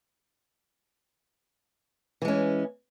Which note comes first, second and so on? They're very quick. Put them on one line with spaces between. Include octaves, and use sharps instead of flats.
E3 G#3 C#4